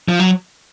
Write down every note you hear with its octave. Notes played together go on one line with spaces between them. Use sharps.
F3
F#3